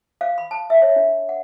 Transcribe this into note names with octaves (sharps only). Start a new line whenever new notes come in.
F5
B5
A5
E5
C#5
D4
F#5